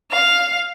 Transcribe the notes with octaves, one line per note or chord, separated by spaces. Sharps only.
F5